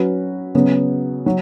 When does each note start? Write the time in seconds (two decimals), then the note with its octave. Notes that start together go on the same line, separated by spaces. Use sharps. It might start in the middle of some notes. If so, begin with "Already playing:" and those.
Already playing: F#3 C#4 F#4 B4
0.55 C#3 F#3 B3
1.26 F#3